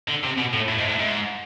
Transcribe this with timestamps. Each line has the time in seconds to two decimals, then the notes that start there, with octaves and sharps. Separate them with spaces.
0.08 D3
0.24 C3
0.38 B2
0.53 A2
0.68 A2
0.79 G#2
0.88 A2
0.99 G#2